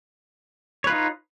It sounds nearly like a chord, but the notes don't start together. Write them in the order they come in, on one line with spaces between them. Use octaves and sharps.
C#5 B4 F4 D#4